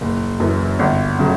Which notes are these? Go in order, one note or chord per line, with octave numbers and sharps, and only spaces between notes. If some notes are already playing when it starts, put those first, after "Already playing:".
F#1
F#2 E3
G1
C#3 F#3 A3